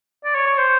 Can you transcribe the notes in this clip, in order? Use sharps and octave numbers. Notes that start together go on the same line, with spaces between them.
D5
C#5
C#5
C5